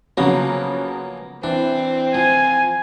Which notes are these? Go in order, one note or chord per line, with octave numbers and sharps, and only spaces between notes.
C#3 F3 F#3 A#3 B3 C#4
E3 C4 D4
F3 G#5